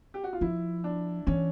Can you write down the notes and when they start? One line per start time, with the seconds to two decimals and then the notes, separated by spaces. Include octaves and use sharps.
0.14 G4
0.24 F#4
0.33 F4
0.41 F3 E4
0.84 D4
1.27 E3 C#4